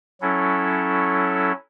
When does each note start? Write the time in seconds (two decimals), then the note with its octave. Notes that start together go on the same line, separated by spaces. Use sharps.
0.21 F#3 C#4 E4 A4